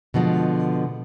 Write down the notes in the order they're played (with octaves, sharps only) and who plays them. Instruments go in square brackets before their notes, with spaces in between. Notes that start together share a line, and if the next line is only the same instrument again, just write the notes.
[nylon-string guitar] B2 D3 F3 G#3